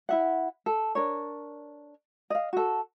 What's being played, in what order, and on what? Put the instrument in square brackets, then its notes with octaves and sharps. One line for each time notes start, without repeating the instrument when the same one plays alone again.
[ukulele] E4 E5 F#5
A4
D4 A#4 C#5
D#5 F5
F#4 A4